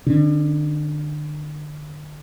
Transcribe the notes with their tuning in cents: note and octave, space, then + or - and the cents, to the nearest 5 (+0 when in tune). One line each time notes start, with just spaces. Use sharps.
D3 +35 C#4 +0